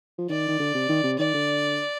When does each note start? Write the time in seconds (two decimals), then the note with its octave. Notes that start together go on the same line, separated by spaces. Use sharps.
0.19 F3
0.30 D#3 D5
0.48 D#3
0.59 D3
0.75 C3
0.89 D#3
1.04 C3
1.19 D#3 D5
1.34 D3